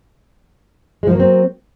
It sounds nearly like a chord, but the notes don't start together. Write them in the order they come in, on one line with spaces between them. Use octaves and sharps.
G#3 F3 A#3 F#3 C4